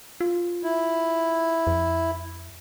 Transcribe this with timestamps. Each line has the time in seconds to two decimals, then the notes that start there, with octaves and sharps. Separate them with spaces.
0.21 F4
0.63 E4
1.67 F2